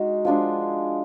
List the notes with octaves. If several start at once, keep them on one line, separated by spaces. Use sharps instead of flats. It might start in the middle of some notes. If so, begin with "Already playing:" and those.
Already playing: G#3 D#4 F#4
F3 G#3 D4 G#4